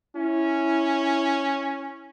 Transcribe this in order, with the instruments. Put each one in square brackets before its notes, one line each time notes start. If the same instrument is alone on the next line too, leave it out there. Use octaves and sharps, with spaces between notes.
[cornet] C#4 [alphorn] E4